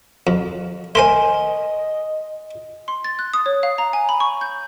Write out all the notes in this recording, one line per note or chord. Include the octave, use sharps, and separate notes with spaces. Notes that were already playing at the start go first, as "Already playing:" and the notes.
F2
A3 A#4 C5 D#5 G#5 C6
C6
A6
F#6
D#6
C#5
F5
A#5
G#5
B5
C#6
G6